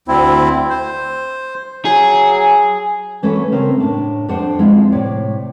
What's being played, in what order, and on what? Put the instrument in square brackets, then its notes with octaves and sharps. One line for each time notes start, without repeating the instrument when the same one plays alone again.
[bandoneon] D2 C4 E4
C5
[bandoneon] F#3 [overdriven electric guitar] G#4
[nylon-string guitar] E3 A3 C#4 F#4 A4 B4
C#3 A3 C4 A#4
A2 D4
F2 F3 D4 C5 F#5
F3 G#3 B3 C4 E4
A2 C3 C#5 D5